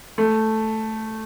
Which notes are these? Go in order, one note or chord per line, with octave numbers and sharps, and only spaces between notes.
A3